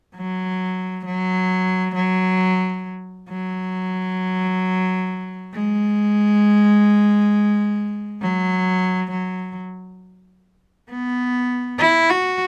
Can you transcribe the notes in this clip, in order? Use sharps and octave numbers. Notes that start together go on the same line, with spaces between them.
F#3
F#3
F#3
F#3
G#3
F#3
F#3
B3
E4
F#4